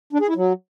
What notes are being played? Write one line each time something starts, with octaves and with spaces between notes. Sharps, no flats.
D4
G#4
E4
F#3